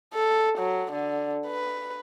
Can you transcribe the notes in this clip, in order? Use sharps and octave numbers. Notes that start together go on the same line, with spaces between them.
A4
F#3
D3
B4